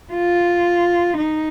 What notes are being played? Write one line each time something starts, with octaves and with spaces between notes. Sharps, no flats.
F4
D#4